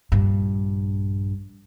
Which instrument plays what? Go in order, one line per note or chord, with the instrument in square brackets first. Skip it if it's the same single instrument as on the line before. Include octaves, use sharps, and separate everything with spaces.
[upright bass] A#1 G2